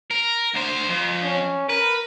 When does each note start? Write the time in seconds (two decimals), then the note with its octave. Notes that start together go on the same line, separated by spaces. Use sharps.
0.11 A#4
0.54 D2 C5
0.89 F2
1.22 C#4
1.69 A#4 B4